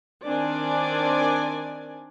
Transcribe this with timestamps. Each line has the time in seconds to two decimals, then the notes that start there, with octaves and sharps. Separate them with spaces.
0.25 D#3 C4 D4 D5 G#5